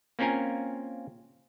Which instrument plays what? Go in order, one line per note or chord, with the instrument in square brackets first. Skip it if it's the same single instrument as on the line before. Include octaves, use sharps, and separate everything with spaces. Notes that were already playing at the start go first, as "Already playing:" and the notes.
[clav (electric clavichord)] A#3 C4 C#4 F4 A#4 G#5